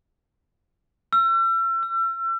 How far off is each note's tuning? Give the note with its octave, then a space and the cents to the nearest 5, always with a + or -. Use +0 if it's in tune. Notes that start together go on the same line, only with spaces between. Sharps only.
E6 +40
E6 +35